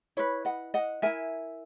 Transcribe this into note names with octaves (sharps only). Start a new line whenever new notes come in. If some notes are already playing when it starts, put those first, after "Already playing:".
E4 B4 C#5
D#5 F#5
D#5 F#5
E4 A#4 E5 G#5